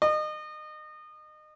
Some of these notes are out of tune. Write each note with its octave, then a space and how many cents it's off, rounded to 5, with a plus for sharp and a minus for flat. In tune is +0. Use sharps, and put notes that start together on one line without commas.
D#5 -30